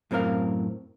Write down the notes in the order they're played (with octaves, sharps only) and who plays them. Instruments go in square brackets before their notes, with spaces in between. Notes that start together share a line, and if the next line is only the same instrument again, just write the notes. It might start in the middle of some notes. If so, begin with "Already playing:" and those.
[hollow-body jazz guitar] F#2 A2 C4 A#4 F5